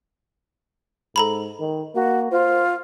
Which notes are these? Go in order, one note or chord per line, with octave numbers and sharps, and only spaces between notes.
G#2 A4 A#5 B5
D#3
A#3 F#4
F4 C5